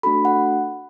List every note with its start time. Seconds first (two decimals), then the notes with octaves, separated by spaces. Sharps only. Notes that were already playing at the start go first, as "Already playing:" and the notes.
0.03 A3 D4 F#4 A4 B5
0.25 F#5